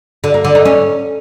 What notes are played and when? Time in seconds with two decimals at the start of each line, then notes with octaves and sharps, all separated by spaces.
0.24 D3
0.34 A#3
0.45 D3
0.55 D#4
0.65 C#4